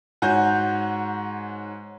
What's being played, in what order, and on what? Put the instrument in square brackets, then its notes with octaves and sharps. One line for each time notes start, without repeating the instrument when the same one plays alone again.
[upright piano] G#2 F#4 C#5 G#5 G6